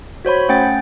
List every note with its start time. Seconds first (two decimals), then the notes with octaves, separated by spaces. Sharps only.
0.25 F#4 C5 C#5 B5
0.49 A3 C#4 F#5 G5 A6